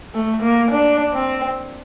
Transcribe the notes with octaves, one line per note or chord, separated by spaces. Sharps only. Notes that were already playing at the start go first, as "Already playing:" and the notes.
A3
A#3
D4
C4